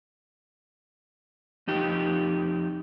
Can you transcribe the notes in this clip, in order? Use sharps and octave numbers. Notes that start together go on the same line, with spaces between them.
F2 D#4 G4